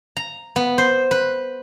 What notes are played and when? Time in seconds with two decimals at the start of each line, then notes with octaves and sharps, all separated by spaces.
0.17 A#5
0.56 B3
0.78 C5
1.11 B4